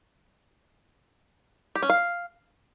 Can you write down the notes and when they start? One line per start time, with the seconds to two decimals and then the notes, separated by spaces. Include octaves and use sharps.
1.75 G4
1.82 C#4
1.90 F5